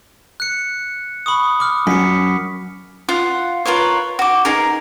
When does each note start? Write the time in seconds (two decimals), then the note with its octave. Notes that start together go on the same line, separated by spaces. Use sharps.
0.40 F#6 C#7
1.26 B5 C#6 D#6
1.60 D6 F6
1.87 F#2 B6 C#7
3.09 F4 F#5
3.65 F4 A#4 B4 C#5
4.19 F#4 D6
4.45 D#4 G#4 A#4